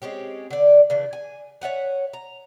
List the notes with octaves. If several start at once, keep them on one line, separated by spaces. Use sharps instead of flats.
G#3 C4 C#4 G4
D3 D5
C#3 E3 D4
G#5
C#5 E5 F#5 G#5
A#5